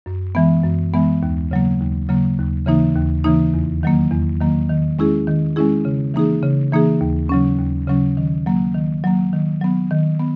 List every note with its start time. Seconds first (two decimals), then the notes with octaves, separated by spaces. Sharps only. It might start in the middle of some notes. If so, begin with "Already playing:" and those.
0.06 F#2
0.35 E3 G#3 B3
0.64 F#2
0.93 E3 G#3 B3
1.23 D#2
1.51 C#3 F#3 A#3
1.80 D#2
2.09 C#3 F#3 A#3
2.38 D#2
2.66 C#3 E3 A#3 D#4
2.96 D#2
3.24 C#3 E3 A#3 D#4
3.54 E2
3.83 D#3 F#3 A#3
4.11 E2
4.40 D#3 F#3 A#3
4.69 D#3
4.99 G#3 C#4 E4 G#4
5.28 D#3
5.56 G#3 C#4 E4 G#4
5.85 C#3
6.14 E3 A#3 D#4 G#4
6.43 C#3
6.73 E3 A#3 D#4 G#4
7.01 D#2
7.29 C#3 F#3 C#4
7.58 D#2
7.88 C#3 F#3 C#4
8.17 D#3
8.46 F#3 A#3
8.75 D#3
9.04 F#3 A#3
9.33 D#3
9.61 F#3 B3
9.91 D#3
10.20 B3